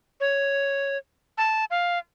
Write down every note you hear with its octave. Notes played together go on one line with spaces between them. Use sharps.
C#5
A5
F5